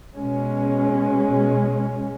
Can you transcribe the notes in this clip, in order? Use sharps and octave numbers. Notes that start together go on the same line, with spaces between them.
B2 G#3 C#4